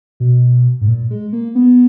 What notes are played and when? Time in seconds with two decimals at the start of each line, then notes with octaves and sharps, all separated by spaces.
0.20 B2
0.81 G#2
0.88 A#2
1.11 G#3
1.33 A#3
1.55 B3